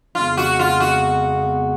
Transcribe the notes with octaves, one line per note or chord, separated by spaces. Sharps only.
F2 C#3 G#3 B3 F4
F#4
F4
F#4